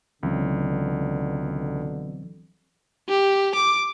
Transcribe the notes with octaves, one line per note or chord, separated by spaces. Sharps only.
C#2 B2 D3 E3 F#3 C4
G4
D6